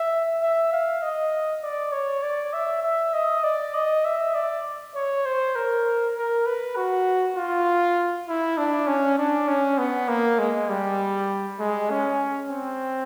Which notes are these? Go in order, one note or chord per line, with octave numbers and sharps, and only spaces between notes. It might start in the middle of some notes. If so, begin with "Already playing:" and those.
Already playing: E5
E5
F5
D#5
D5
C#5
D5
E5
E5
D#5
D5
D#5
E5
D5
C#5
C5
A#4
A#4
B4
F#4
F4
E4
D4
C#4
D4
C#4
B3
A#3
G#3
G3
G#3
C#4
C4